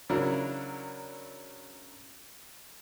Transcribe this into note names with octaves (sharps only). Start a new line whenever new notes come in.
C#3 F#3 D4 E4 A#4